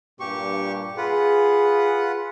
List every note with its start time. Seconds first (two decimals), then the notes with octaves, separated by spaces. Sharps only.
0.20 G2 A#2 G4 C#6
0.97 F4 G#4 B4 F#5